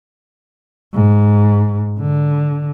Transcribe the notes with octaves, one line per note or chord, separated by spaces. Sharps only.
G#2
D3